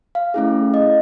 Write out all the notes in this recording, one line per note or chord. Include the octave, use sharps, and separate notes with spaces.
F5
A3 C#4 E4 G#4
D#5